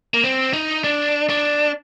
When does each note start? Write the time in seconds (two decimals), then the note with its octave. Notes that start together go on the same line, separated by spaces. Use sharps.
0.14 A#3
0.24 C4
0.53 D#4
0.84 D4
1.30 D4